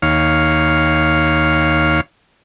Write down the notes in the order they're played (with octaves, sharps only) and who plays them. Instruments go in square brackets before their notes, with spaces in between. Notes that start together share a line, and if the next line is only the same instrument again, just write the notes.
[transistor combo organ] D#2 C#5 F5